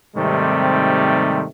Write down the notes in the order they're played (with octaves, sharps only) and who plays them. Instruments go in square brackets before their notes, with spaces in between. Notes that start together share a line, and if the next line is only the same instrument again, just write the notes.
[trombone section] G#2 C3 D#3 G3 A3 C4